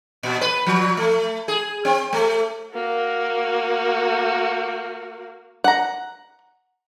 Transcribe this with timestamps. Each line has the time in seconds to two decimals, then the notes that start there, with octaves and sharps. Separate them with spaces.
0.23 A#2
0.41 B4
0.66 F3
0.97 A3
1.48 G#4
1.85 C4
2.13 A3
2.73 A#3 F#4
5.64 F#5 A#5